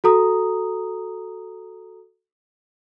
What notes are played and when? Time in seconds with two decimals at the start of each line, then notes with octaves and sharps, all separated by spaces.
0.04 F#4 A4 A#5 D#6